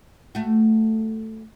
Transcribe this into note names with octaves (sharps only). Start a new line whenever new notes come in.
A3 F#4